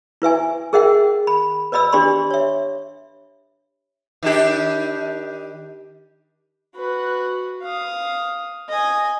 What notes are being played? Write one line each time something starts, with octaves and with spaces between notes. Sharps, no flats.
E4 B4 E5 G#5
G#4 A#4 D#5 E5 F#5 G5
B5
B4 D5 D#5 B5 E6
D4 G4 D5 B5 C6
C#5 E5
D#3 D4 G4
F#4 B4
F5 D#6
D#5 G#5